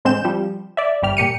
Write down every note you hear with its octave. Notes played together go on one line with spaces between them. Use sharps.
A1 D3 G#3 C4 G6 E7
F3 G3
D5 E5
G1 G3 G4 F6
A#2 G4 C#7 D#7